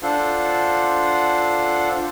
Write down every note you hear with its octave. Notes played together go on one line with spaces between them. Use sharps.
D4 F4 A4 C5 F#5